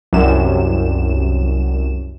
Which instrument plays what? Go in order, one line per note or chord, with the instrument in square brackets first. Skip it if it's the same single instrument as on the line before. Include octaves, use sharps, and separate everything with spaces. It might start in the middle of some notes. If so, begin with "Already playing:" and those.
[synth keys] C2 F#2 E7